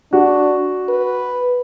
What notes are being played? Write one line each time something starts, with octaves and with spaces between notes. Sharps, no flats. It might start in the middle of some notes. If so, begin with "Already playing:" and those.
D4 F#4
B4